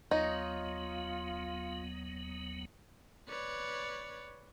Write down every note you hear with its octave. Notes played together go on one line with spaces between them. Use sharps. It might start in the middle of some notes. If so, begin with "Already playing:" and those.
D#2 F#3 B3 D#4 F4 C#5 D#5
B4 C#5 D5